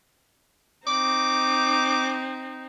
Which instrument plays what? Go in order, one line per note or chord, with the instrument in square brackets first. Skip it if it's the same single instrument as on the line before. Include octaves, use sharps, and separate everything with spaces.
[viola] C4 D#4 [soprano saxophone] D6